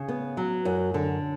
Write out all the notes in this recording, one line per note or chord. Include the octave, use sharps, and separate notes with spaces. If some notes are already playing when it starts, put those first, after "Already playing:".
Already playing: C#3
B3
F#3
F#2
D3